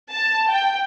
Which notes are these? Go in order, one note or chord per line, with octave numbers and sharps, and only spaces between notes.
A5
G5